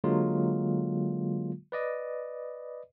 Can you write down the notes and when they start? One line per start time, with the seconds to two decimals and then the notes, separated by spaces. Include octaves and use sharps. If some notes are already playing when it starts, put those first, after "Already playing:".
0.04 D3 F#3 G#3 A#3 F4
1.72 B4 D5 D#5